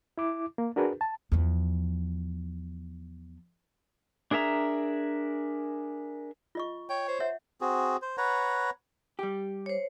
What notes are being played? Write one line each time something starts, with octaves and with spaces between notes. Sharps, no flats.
E4 D6
A#3
D4 F#4 G#4 A#4 B4
A5
E2 F3
D4 G#4 A#4 E5 A#5
F4 D#5 C#6
C#5 G5
C5
C#5 E5 F#5
C4 F#4 G#4
C5
B4 C#5 F#5 A#5
G3 G4
C5 C#5